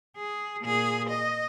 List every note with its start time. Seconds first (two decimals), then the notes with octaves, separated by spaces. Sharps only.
0.16 G#4
0.62 A#2 G#4
1.09 D#5